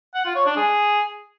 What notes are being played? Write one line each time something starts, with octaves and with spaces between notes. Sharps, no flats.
F#5
F4
C#5
D4
G#4